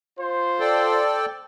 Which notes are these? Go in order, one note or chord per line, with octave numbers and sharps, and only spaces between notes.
F4 C5
A4 D5 G5